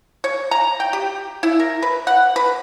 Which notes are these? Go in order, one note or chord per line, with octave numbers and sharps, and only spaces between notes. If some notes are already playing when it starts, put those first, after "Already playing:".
C#5
A#5
G5
G4
E4
A#4
B4
F#5
B4